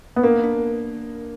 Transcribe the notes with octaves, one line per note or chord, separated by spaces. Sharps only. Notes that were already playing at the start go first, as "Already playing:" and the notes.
B3
A#3 D4
D4